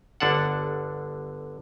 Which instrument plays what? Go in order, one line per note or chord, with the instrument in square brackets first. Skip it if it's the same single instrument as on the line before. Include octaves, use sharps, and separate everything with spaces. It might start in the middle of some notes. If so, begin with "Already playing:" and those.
[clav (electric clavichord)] G1 D3 D4 A4 F#5